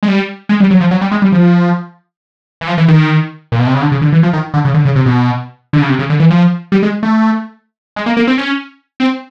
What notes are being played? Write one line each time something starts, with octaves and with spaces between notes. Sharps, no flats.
G#3
G3
G#3
G3
F#3
F3
F#3
G3
G#3
G3
F3
E3
F3
E3
D#3
A#2
B2
C3
C#3
D3
C#3
D3
E3
F3
D#3
D3
C#3
D3
C#3
C3
B2
D3
C#3
C3
C#3
D3
E3
F3
G3
G#3
A3
G#3
A#3
A#3
C4
C#4
C4